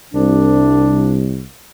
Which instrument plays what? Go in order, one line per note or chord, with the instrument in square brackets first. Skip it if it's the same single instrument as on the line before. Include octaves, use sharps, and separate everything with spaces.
[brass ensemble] C2 [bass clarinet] D4